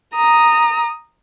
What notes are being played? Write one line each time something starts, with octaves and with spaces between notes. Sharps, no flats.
A#5 D#6